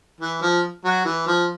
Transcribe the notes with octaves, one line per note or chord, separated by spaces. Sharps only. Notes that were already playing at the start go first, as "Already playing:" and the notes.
E3
F3
F#3
E3
F3